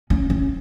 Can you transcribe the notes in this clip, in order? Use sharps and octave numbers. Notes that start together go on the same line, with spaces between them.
C#4
C#4